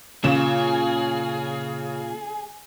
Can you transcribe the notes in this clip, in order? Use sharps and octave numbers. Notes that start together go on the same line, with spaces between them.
A#2 C#3 G#4 E7